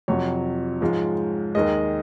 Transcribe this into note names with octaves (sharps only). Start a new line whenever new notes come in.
F2 C3 F#3 C#5
G#2 F3 G#3
D#2 D#3 G#3 D#5